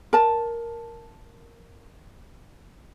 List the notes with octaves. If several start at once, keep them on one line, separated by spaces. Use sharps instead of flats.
A#4 A5